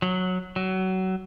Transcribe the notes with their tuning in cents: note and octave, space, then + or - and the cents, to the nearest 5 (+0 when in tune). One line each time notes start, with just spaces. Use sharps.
F#3 -10
F#3 +25